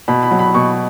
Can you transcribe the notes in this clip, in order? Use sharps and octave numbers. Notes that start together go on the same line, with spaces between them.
B2 B5
B5
F#3
B5
B2 C#6